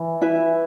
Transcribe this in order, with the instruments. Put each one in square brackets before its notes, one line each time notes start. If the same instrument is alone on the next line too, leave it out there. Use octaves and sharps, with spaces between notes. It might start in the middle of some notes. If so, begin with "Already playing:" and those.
Already playing: [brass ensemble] E3
[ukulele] E4 B4 E5